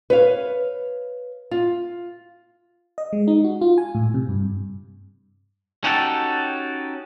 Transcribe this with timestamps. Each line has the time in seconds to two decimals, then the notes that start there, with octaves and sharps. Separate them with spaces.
0.10 B4 C#5 F5
1.51 F4
2.98 D#5
3.13 G#3
3.28 D#4
3.44 F#4
3.61 F4
3.78 G#5
3.95 A2
4.14 C3
4.29 G2
5.84 C#4 D#4 F#4 G4 A4